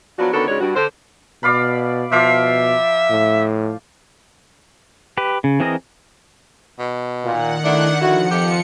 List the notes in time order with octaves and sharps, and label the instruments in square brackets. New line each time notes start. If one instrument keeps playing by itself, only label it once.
[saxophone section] F3 F#3 B3 D4 F#4
D3 D#3 B3 C#4 F#4 A4
G#2 C#3 G#3 D4 F#4 C#5
G2 F#4
D3 C5
[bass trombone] B2 [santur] D5 F5 B5
[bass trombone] B2 [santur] F3 F5 D6 [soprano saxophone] E5
[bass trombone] A2
[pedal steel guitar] G4 B4
C#3
E3 C4 G#4 A#4 D#5
[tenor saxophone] B2
[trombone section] A#2 [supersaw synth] D#3 F#5
[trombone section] A3 E4 [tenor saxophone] D4
[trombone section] D3 F#4 [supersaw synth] F3 C#7 [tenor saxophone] E4
[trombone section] F2 [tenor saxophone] G4